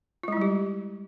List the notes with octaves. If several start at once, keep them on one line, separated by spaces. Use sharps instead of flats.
G3 G#3 E4 F4 G4